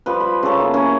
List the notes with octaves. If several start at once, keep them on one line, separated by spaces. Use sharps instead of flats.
F3 G3 B4
B5
C#3 G4 A4 C#5
A#3 B3 E4
A#3 C#4 E4